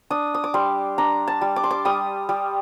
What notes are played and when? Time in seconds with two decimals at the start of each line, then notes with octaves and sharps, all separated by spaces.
0.10 D4 D#6
0.34 D#6
0.44 D6
0.54 G3 C6
0.98 D4 A#5
1.28 A5
1.41 G3
1.56 D6
1.64 C6
1.71 D6
1.85 G3 D#6
2.29 G3